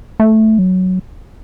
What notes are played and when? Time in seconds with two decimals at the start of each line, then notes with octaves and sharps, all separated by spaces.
0.20 A3
0.58 F#3